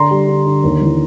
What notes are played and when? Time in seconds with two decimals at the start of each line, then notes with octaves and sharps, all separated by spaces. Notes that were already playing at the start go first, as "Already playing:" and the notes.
Already playing: D3 A#5 C6
0.11 G3
0.28 D3
0.46 D3
0.64 D#2
0.81 E3